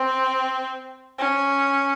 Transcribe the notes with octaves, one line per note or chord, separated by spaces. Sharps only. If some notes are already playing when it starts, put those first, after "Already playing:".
Already playing: C4
C#4